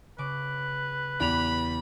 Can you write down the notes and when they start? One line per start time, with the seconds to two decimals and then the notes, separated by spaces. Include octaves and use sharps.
0.18 C#3 B4 D6
1.20 E2 G4 B5 F7